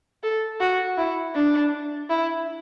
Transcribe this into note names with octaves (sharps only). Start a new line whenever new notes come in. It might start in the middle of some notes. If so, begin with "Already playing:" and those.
A4
F#4
E4
D4
E4